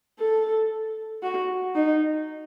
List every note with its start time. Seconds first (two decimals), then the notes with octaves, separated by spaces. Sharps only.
0.19 A4
1.23 F#4
1.75 D#4